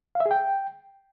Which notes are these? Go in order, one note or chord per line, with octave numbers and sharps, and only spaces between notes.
F5
E5
G#4
G5